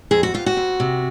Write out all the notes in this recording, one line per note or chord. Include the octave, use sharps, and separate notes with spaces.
F2 G#4
F#4
F2 F4
F#4
F2
C3